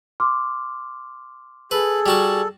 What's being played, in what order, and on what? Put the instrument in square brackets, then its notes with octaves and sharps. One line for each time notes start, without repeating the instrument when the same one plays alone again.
[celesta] C6 D6 F6
[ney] G#4 [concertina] A4 [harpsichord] B4
[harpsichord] G3 F#4 A5